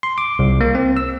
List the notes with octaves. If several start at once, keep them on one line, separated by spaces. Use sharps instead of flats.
C6
D6
C2
A#3
C4
E6